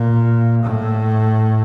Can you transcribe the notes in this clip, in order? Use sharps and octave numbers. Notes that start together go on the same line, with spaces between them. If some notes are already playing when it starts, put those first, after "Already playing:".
Already playing: A#2
A2